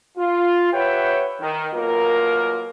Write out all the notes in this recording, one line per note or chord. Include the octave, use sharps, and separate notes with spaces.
F4
G4 B4 C#5 E5 F#5 G5
D#3
B1 A#3 F4 A#4